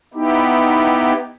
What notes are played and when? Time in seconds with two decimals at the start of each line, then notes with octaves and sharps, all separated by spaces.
0.14 B3 D#4 E4 G4